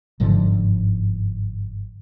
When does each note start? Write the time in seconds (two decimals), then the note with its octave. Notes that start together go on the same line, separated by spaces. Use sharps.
0.20 G1 G#2 D3 F3